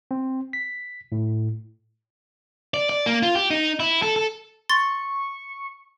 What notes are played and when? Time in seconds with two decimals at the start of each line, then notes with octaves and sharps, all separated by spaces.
0.11 C4
0.53 B6
1.12 A2
2.74 D5
2.89 D5
3.06 A#3
3.23 F4
3.35 G4
3.51 D#4
3.80 E4
4.02 A4
4.16 A4
4.69 C6 C#6 A6